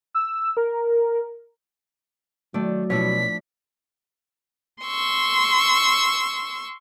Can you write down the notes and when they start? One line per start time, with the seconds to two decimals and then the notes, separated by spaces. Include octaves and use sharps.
0.15 E6
0.57 A#4
2.54 D#3 F#3 A3 D5
2.90 B2 F3 D4 E4 C#5 B6
4.84 C6 C#6 E6